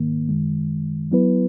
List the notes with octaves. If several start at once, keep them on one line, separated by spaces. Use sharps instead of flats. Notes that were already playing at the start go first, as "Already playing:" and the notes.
Already playing: G#2 D#3 A#3
F#2 D#3 G#3
F#3 B3 E4 B4